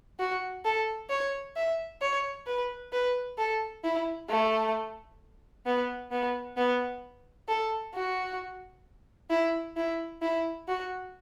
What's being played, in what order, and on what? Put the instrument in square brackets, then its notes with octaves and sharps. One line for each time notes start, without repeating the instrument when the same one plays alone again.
[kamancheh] F#4
A4
C#5
E5
C#5
B4
B4
A4
E4
A3
B3
B3
B3
A4
F#4
E4
E4
E4
F#4